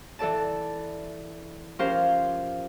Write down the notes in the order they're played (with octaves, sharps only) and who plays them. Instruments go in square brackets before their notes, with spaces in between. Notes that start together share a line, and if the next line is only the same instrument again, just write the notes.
[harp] E3 A4 D5 A5
F3 C#4 G4 A#4 C5 F5